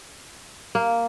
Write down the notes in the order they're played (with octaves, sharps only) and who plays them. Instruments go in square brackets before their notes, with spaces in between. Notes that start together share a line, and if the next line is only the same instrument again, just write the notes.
[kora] A#3